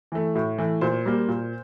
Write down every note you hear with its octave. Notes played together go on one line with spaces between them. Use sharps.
E3 A3
A2
E3 A3
A#2 C5
G3 A#3
A#2